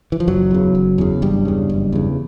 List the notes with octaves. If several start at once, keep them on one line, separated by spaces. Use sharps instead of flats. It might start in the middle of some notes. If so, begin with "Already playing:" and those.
E3
F3
F#1 F#2 F#3
E2 C#3
F#1
E2 C#3
F#1 G2 G3
E2 C#3
F#1
E2 C#3